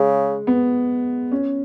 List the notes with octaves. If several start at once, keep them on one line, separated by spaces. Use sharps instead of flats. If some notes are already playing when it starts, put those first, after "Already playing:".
Already playing: C#3 G#3
B3
C#4